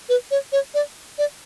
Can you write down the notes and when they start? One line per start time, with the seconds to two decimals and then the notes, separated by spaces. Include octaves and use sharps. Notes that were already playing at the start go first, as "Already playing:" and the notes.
0.09 B4
0.31 C#5
0.52 C#5
0.74 D5
1.18 D5